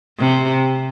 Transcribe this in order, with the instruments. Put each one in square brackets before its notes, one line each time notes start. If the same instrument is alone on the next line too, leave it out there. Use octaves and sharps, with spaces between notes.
[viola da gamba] C3